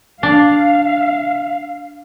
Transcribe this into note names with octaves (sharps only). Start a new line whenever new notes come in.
D4 F5